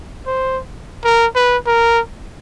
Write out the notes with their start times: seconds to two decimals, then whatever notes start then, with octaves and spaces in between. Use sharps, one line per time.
0.26 C5
1.04 A#4
1.35 B4
1.66 A#4